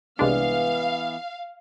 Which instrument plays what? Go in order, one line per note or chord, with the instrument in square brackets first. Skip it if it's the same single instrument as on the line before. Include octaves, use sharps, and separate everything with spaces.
[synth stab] C2 G#3 D4 [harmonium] E3 B3 [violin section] F5